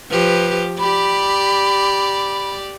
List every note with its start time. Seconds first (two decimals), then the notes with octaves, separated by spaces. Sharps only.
0.10 F3 G4 B4
0.79 G4 D5 B5